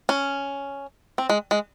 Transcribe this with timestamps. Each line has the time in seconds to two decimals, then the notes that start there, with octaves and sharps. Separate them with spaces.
0.09 C#4
1.18 C4
1.29 G#3
1.51 G#3